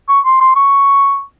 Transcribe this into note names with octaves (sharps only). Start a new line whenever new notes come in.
C#6
C6
C6
C#6